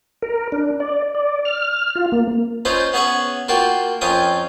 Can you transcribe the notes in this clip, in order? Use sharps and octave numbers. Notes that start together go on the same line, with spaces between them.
A#4
D4
D5
D5
F6
F4
A#3
C#4 D#4 F4 B4 C5
B3 C#4 G#4 C#5 E5 F#5
A#3 F4 F#4 G5 A5
F2 C#4 F4 G5 G#5 D#6